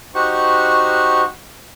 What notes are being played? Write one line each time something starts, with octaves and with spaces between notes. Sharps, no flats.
D#4 F#4 G4 C5 F#5 C#6